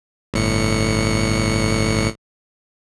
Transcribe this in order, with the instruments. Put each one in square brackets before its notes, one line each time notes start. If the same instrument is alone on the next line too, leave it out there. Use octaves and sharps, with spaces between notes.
[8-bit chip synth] G1 A2 C#7